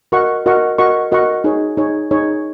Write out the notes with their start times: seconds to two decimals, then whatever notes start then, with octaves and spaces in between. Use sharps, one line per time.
0.12 F#4 A#4 D#5 F#5 C#6
0.46 F#4 A#4 D#5 F#5 C#6
0.78 F#4 A#4 D#5 F#5 C#6
1.12 F#4 A#4 D#5 F#5 C#6
1.44 D#4 G#4 C#5
1.77 D#4 G#4 C#5
2.11 D#4 G#4 C#5